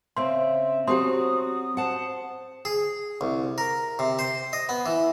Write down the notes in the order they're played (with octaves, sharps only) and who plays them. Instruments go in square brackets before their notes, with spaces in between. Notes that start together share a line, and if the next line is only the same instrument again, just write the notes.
[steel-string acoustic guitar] C#3 C4 [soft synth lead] E5 [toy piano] C6
[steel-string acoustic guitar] F#3 C4 [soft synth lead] F#4 [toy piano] G4 C6 [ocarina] D#6
[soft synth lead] C5 [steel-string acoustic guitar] F#5 A5
[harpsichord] G#4
C2
A#4
C3
C5
D#5
B3
E3